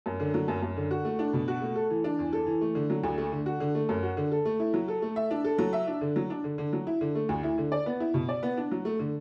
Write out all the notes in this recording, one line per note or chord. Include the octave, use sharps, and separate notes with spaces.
F#2
D3
F#3
F#2
F#2
D3
F#4
A3
D4
B2
F#4
A3
A4
E3
D4
E2
A4
E3
A3
D3
F#3
D2
A3
D3
F#4
D3
A3
F#2
F#4
D3
A4
A3
E4
F#3
A4
A3
E5
D4
A4
F#3
E5
D4
D3
F#3
D4
D3
D3
F#3
E4
D3
A3
D2
E4
D3
D5
B3
E4
B2
D5
B3
D4
F#3
A3
D3